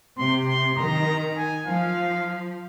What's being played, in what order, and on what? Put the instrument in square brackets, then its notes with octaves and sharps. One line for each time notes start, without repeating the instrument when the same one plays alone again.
[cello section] C3 [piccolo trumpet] C6
[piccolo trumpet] C6
[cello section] D#3 [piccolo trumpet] A#5
[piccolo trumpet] G#5
[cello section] F3 [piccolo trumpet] F5